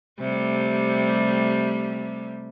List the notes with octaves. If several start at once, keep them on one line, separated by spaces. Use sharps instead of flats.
C3 G3 A3